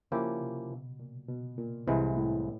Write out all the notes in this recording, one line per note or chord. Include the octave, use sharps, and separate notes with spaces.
C#3 F3 A#3 C#4 E4 G4
C3
B2
A#2
B2
A#2
C2 A2 C3 E3 G#3
A2